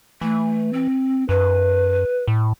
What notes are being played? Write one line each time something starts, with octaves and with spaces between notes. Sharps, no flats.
E3 A3
C4
F#2 B4
A2